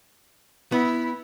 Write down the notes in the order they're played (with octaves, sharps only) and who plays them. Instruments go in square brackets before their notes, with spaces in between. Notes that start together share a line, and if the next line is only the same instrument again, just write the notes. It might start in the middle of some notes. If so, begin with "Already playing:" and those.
[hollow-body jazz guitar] B3 [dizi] E4